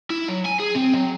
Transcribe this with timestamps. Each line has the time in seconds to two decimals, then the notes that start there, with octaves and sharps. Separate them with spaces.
0.10 E4
0.28 F#3
0.45 G#5
0.59 G#4
0.75 C4
0.93 F#3